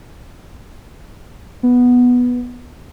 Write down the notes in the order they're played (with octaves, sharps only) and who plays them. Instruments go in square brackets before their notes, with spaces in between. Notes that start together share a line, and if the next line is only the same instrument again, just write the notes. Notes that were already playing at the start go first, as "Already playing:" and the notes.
[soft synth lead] B3